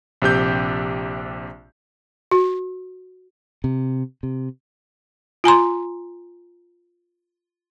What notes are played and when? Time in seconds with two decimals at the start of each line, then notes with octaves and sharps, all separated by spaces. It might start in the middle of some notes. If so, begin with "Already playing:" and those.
0.22 A#1 C3 G4 G6
2.31 F#4
3.64 C3
4.23 C3
5.44 F4 G#5 A#5 C6